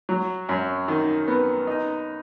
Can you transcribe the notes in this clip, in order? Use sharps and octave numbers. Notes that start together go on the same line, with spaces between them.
F#3
F#2
D#3
B3
D#4